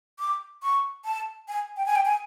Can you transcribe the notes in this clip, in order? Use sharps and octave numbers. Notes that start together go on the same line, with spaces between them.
D6
C#6
A5
G#5
G5
G#5
G5
G#5